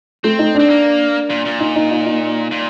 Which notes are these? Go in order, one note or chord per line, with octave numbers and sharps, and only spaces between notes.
A3 C4
D#4
C4 D4
A#3
A#2
A#2
D#4
D#4
D#4
D#4
A#2